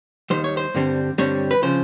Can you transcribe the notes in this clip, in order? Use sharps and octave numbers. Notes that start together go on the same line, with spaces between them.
D#2 D#3 G3 C5
C#5
C5
G2 D3 G3 C4
G2 D3 G3 C4 C#5
B4
C#3 F3 C5